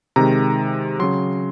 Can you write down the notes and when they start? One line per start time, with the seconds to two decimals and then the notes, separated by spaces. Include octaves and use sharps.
0.16 C3 D#3 G#3 A#5
0.99 C#3 F#3 C6